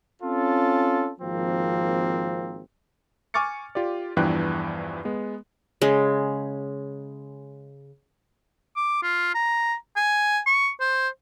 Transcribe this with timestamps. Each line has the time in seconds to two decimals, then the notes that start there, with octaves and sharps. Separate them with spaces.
0.22 C4 C#4 F4 A4
1.20 G#1 F3 A#3 C4
3.34 G#5 C#6 D6 F6 A6 C#7
3.75 F4 G4 D5
4.17 E2 G2 E3 F3 G5 F#6
5.05 G#3 B3
5.82 C#3 G#3
8.76 D6
9.03 F4
9.35 A#5
9.97 G#5
10.47 C#6
10.81 C5